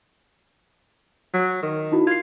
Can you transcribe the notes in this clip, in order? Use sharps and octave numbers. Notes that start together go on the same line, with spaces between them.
F#3
D#3
D#4 E4 F#4
F4 G#6 C7